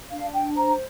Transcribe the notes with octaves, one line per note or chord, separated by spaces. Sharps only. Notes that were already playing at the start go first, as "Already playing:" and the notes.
D4 F5
G5
C5 A#5